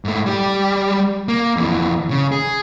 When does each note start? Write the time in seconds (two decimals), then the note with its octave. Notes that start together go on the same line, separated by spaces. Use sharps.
0.05 G#2 A3
0.26 G3 G4
1.28 A#3
1.57 F2 E3
2.10 C#3
2.32 G#4